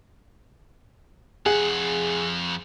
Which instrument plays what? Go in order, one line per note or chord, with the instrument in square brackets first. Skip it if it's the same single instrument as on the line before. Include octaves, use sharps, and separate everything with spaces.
[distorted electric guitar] F2 F#5 [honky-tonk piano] G#4